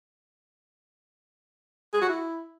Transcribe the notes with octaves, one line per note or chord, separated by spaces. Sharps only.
G#4
F#4
E4